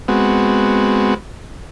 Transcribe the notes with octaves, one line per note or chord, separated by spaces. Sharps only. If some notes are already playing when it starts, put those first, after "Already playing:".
G#3 B3 C4 F#4